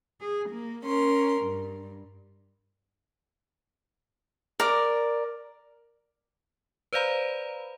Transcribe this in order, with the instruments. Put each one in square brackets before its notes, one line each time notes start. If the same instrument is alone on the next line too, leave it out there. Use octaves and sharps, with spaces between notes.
[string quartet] G#4
A#3
C#4 A#4 C6
G2
[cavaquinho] A#4 D5
[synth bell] B4 C5 D5 F5 A#5 B5